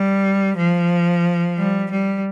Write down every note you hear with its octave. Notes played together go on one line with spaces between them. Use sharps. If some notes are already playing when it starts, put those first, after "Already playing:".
Already playing: G3
F3
G3
G3